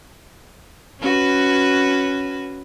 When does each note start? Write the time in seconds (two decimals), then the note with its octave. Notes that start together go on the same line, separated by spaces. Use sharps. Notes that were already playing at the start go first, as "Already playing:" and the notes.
1.01 C#4 F#4 B4